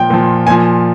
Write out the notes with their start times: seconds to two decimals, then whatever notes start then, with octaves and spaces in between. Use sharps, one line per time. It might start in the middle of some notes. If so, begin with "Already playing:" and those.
Already playing: A#2 F3 G5
0.10 A#2 F3
0.47 A#2 F3 G#5